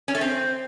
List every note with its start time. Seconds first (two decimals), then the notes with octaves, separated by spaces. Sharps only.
0.08 C#4
0.15 A3
0.21 C4